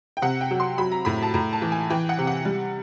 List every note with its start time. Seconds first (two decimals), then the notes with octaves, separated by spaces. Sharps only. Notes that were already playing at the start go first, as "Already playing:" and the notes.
0.17 G5
0.22 C3 F#5
0.41 G5
0.51 F#3
0.60 C6
0.78 F#3 B5
0.92 A#5
1.05 A2 B5
1.22 A5
1.34 A2 A#5
1.53 A5
1.62 E3
1.72 G#5
1.90 E3 G5
2.09 F#5
2.18 C3
2.27 F#5
2.45 G3